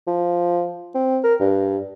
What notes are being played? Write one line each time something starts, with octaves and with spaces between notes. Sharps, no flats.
F3
C4
A#4
G2